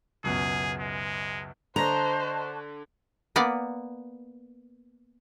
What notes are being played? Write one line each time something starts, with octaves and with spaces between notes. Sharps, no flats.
C#2 F#2 B2 G#4
G#3
D3 C5 D#5 A5 A#5 C#6 F#6 A#6
A#3 B3 D5